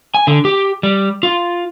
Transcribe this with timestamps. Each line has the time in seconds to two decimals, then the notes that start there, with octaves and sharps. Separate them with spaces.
0.14 G#5
0.27 D3
0.45 G4
0.83 G3
1.23 F4